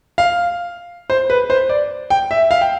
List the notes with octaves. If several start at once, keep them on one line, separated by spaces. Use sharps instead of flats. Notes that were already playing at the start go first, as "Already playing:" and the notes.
F5
C5
B4
C5
D5
G5
E5
F5
G5